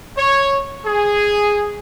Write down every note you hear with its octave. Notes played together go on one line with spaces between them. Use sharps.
C#5
G#4